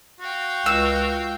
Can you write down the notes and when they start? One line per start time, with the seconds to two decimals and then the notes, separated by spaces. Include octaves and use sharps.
0.20 F#4 F5 G5
0.66 C#2 E6